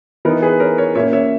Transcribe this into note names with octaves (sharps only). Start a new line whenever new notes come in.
E3 B3 D#4 A#4
G#4 B4
A#4 C#5
A#4 C#5
A#2 A#3 C#4 C#5 E5
C#5 E5